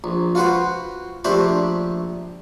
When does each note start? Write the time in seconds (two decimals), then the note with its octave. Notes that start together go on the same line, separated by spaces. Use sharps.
0.04 A#1
0.35 F4 F#4 B4 C5
1.24 A#1 A3 D4 G4 C5 B5